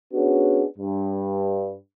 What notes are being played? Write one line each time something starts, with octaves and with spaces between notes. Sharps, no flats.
B3 C#4 D4 F#4 G#4
G2